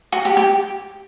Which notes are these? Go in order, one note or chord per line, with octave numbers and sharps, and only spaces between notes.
F#4
G4
G4